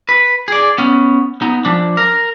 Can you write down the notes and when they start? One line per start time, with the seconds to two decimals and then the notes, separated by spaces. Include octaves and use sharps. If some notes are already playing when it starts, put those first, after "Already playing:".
0.09 B4
0.48 G#4 D5
0.78 B3 C#4
1.42 B3 D#4
1.65 F3 D4
1.97 A#4